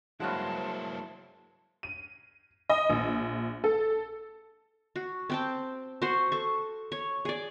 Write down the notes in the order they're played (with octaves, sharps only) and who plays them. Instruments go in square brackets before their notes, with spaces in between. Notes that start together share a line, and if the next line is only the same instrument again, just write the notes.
[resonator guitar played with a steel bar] G2 F#3 G#3 [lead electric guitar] A#3 E4 [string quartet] C5 A5
[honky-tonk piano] D#7
D#5
A#1
A4
[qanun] F#4
C4 G5 A5
F#4 C5
A4 C#6
C#5
G#4 D5